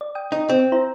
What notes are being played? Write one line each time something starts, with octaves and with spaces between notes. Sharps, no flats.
D5
G5 D#6
D#4
C4
E4 C5 A#5